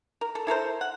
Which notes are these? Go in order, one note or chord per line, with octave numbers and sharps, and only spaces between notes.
A#4
A4
E4 A4 A#4 C5
F#5